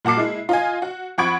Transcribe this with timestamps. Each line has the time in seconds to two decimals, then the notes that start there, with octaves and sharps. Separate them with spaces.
0.05 A#2 F#4 A5 D6 C7
0.17 G#3 E4
0.49 F4 D#5 G#5
0.82 F#4
1.18 F2 F#5 B5 C#6 G#6 D7